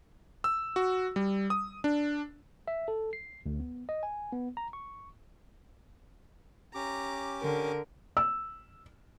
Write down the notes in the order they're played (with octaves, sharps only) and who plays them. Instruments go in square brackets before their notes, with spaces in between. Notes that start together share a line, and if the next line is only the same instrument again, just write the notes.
[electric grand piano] E6
F#4
G3
D#6
D4
[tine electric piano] E5
A4
C7
D2
B3
D#5
G#5
B3
A#5
C#6
[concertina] C#4 G4 D6 [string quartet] A#5
[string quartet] D3 A#4
[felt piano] E6